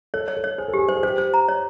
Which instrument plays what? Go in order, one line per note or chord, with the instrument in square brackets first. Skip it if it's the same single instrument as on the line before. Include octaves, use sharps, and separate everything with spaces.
[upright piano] A4 [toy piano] C#5
[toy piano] C#5
[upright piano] A4
[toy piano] C#5
[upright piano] G#4 [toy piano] C5
[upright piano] A4
[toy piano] G4 [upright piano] G#4
[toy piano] C5
[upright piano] G#4
[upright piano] G4 [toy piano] C5
[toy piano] C5
A#5
C#5